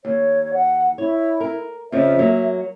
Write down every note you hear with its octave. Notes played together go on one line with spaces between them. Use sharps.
D#2 C#5
F#5
E4 C#5
A#4
F2 C#3 F3 E5
F#3 A#3